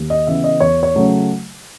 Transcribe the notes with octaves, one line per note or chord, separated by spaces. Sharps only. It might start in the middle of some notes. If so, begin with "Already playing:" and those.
Already playing: D#2
D#5
C#3 E3 B3 E5
D#5
E2 C#5
C#5
C#3 F#3 A3